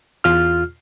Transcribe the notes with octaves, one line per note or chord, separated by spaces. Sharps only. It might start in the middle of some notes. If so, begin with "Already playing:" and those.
E2 F4 F6